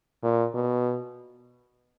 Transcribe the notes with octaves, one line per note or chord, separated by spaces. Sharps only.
A#2
B2